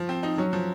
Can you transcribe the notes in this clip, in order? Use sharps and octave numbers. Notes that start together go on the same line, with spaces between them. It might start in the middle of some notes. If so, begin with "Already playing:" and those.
Already playing: F3
C4
D#4
F#3 C#4
F3